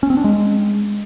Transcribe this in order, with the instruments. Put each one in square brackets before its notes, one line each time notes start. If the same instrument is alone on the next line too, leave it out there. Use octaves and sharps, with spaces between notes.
[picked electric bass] C#4
C4
D4
G#3